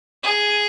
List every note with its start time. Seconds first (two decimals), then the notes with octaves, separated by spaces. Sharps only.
0.23 G#4